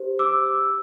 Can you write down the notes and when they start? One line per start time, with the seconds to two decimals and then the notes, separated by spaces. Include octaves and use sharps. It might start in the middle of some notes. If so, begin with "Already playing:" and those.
Already playing: G4 C5
0.19 D6 E6